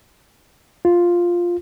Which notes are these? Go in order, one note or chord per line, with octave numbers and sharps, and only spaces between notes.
F4